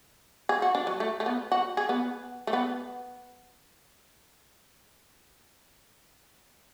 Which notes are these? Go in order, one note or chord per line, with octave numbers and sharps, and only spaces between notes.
G#4
F#4
D4
F#3
A3
A3
B3
F#4
G#4
B3
A3
B3